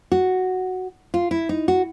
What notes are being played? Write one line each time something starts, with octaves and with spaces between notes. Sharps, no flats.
F#4
F4
E4
D#4
F#4